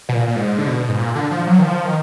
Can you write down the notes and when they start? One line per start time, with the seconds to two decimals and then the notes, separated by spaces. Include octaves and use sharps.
0.09 B2
0.14 A#2
0.28 A#2
0.36 G#2
0.58 D3
0.67 B2
0.89 G#2
0.99 A#2
1.15 D3
1.31 F3
1.47 F#3
1.59 D#3
1.63 F3
1.85 D#3